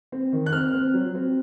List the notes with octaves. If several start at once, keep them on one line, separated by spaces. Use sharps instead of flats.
C4
D#3
F#6
C4 F6
C4
F#3
C4